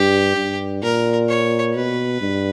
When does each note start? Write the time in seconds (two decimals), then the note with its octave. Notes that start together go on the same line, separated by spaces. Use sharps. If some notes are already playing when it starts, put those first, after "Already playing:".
Already playing: G2 G4
0.37 G2
0.83 A#2 A#4
1.28 C#5
1.74 B2 B4
2.21 G2